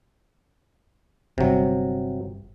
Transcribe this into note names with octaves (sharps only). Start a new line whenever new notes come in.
G1 G2 C3 F#3